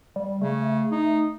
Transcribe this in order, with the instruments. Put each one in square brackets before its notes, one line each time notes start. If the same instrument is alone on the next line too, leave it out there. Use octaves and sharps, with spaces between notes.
[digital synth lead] G3
[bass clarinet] C#3 [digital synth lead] A3
[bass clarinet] D#4